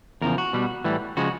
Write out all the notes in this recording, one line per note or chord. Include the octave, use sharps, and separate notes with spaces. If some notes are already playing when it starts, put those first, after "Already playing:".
E2 C#3 F3 A#4
F#4
B2 G3
A2 E3 G3
C#3 F3 G#3 F#4